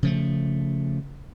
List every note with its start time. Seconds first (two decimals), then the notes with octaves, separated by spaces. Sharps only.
0.03 C#3 F3 A3